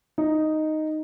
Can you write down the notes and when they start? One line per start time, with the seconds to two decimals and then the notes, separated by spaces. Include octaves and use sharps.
0.18 D#4